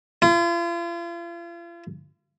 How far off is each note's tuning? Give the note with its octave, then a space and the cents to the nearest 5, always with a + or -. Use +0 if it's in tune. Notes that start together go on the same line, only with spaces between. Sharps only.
F4 -40